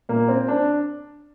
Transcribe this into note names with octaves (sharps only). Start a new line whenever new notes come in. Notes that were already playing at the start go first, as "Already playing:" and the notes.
A#2 A#3
C4
D4